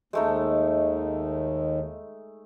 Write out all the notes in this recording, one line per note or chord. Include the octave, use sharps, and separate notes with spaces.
D#2 G#3 A3 D#4